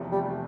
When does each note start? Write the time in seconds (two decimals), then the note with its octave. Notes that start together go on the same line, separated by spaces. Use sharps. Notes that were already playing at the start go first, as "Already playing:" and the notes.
Already playing: F1 E2 C3 F3 A3
0.12 G3